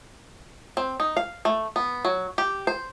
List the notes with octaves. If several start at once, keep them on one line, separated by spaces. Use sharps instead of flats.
C4
D#4
F5
A3
B3
F#3
G4
C5